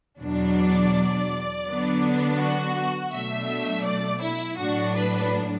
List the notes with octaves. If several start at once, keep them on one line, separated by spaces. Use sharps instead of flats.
E2 B2 F#3 D4
D5
D3 F#3 B3 D4
F#4
B2 F#3 A3 D4 E5
D5
E4
A2 F#3 D4 F#4
B4